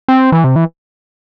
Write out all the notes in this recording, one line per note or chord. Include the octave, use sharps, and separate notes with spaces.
C4
E3
C3
E3